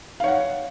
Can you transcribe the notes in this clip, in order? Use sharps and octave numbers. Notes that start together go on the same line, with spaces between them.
C#5 F5 F#5